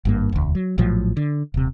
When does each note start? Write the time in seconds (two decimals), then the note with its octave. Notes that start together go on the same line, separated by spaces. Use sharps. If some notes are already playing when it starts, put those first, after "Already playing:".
0.05 G#1 G2 A#3
0.32 E1 D2
0.55 F#3
0.78 A#1 A2 F3 F#3
1.17 D3
1.54 D#1 C3